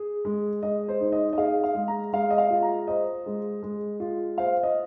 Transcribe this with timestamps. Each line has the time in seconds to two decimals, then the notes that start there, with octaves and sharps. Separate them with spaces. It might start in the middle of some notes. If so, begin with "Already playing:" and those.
Already playing: G#4
0.25 G#3
0.63 G#3 D#5
0.88 C5
1.01 D#4
1.12 D#5
1.33 D#5
1.38 G#4 F5
1.64 F5
1.75 G#3
1.88 A#5
2.13 G#3 F5
2.30 D#5
2.38 F5
2.50 F4
2.62 A#5
2.87 C5 D#5
3.26 G#3
3.63 G#3
4.00 F4
4.38 C5 F5
4.63 D#5